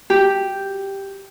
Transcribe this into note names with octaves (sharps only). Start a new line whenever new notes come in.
G4